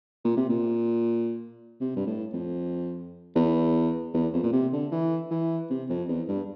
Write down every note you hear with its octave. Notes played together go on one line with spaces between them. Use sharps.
A#2
C3
A#2
C3
G2
A2
F2
E2
E2
F2
A#2
C3
D3
E3
E3
C3
F2
E2
G2